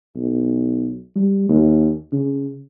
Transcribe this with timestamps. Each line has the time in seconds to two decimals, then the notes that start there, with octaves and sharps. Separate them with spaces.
0.16 B1
1.16 G3
1.49 D#2
2.13 C#3